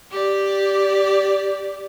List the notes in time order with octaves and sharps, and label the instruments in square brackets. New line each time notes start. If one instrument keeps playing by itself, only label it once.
[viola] G4 D5